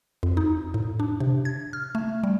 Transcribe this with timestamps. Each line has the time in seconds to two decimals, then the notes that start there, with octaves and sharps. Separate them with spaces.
0.23 F2
0.37 D#4
0.74 A2
1.00 D4
1.20 C3
1.45 G#6
1.73 F6
1.95 A3
2.24 G3